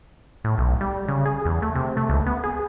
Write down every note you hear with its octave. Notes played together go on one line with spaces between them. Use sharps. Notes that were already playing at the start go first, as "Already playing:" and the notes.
A2
B1
G3
C#3
G#4
E2
A3
C3
A3
C#2
B3
G#4